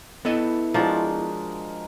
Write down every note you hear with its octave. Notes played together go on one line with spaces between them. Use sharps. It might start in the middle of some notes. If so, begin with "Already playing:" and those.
B3 E4 A4 D#5
F3 G#3 D4 F#4 A#4